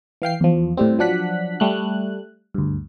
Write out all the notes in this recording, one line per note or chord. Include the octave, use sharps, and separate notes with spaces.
E3 F5 G5 C7
E2 F3
A2 G3 C4
F3 F#3 D4 F#5 F#6 B6
G3 A3 F#6
D2 G2